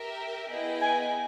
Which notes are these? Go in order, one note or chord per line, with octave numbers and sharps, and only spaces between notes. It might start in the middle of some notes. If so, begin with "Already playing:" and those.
Already playing: G4 A#4 E5
B3 E4 G#4 D#5 G5
G#5